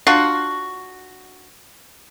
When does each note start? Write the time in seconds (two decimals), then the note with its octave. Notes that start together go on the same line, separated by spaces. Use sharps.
0.07 D4 F4 F#4